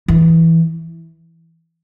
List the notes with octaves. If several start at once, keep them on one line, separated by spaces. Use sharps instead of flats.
E3